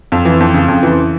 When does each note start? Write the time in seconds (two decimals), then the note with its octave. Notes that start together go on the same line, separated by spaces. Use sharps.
0.12 F2
0.25 E3
0.40 F2
0.54 C#3
0.68 F2
0.83 E3